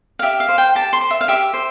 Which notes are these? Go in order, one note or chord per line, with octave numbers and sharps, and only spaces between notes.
F5
G4 E5
F5
C5
G5
G4 A5
C6
C5
E5
F5
G4 E5
C5